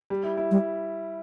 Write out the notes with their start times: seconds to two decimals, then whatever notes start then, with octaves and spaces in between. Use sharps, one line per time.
0.10 G3
0.23 E4
0.37 E4
0.51 G3